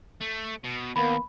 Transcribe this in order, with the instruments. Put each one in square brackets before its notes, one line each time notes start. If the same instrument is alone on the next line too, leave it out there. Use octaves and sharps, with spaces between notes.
[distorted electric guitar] A3
B2
[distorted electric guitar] D#2 [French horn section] A#3 B3 [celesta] B5